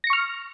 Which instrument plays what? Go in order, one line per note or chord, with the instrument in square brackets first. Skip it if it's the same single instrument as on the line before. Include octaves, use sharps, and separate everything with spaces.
[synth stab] A#6
C#7
C#6
F6